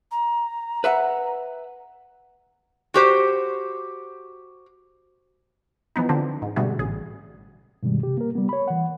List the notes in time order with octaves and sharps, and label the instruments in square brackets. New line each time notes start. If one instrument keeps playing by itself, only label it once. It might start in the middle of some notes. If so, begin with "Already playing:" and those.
[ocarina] A#5
[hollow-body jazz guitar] B4 E5 F#5
[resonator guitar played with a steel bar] F#4 G4 C5
[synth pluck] E3 F3 B3 D#4
D3 F3 C4 D4
G#2
B2 D3 G3 A3 F#4 G#4
A1 G#4
[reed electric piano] G2 B2 D#3 G3 G#3
C3 G4
A#3 A#4
G3 B3
C#5 B5
E3 F#5